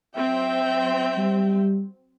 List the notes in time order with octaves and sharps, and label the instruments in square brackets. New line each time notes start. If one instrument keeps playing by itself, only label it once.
[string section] F#3 C4 [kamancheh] E5 G5
[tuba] G3